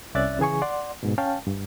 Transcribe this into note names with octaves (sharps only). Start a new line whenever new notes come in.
C2 C#4 D5 E5 F#6 A6
C#3 E3 G#4 G#5 C#6
D5 F#5 C6
G#2 B2
C#4 F5 G5 A5
G2